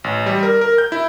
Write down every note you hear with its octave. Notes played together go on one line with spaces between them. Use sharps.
A1
G3
A#4
A#4
G6
E4